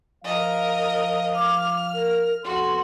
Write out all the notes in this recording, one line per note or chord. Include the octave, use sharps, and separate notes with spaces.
F3 A#4 D#5 F5
D6 F6
A#4
F2 B3 F#4 A4 C6